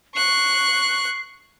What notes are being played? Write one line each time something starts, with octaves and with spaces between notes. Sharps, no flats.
C#6 F#6 C7